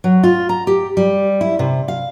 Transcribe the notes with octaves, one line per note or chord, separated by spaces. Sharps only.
F#3
F4
A#5
G4
G3
E4
C3
F5